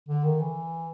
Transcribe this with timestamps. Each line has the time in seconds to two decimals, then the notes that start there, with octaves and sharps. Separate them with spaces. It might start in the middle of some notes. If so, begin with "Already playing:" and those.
0.09 D3
0.24 D#3
0.40 E3